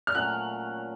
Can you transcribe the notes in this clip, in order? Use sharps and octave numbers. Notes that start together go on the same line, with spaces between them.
F6
A#2 F#3 A3 C#4 F#6